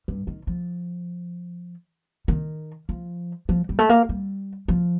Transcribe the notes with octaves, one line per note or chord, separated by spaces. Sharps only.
G2
D#3
F3
D#3
F3
F3
G3
A3
A#3
G3
F3